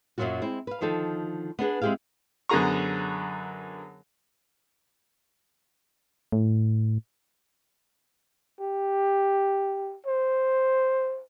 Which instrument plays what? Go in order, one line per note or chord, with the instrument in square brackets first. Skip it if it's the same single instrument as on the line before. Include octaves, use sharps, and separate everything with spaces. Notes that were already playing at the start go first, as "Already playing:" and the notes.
[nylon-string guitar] F#2 A#2 F3 F#3 F4 F#4
G#3 C4 E4
B4 F5
D3 D#3 F3 D#4 A4
B3 D4 G#4 B4
G#3 C4 E4 G4 G#4 F5
[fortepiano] F#2 D3 B3 G#4 A#5 C#6
[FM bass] A2
[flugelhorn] G4
C5